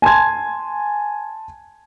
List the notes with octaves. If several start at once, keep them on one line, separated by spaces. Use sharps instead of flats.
G#5 A5 C6 G#6